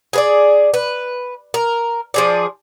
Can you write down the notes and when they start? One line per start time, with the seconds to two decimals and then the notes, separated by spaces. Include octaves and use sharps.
0.13 G#4 B4 D5
0.74 B4
1.54 A#4
2.14 F3 G#4 D5